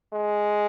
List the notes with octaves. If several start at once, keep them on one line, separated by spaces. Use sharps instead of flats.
G#3